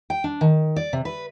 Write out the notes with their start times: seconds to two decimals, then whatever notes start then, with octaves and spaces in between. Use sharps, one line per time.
0.10 G5
0.24 D4
0.41 D#3
0.76 D5
0.93 C3
1.05 B4